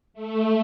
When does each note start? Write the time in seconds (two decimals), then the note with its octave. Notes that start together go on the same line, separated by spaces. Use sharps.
0.14 A3